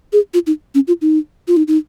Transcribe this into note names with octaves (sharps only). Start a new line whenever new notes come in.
G#4
F4
D#4
C#4
F4
D#4
F4
D#4
D#4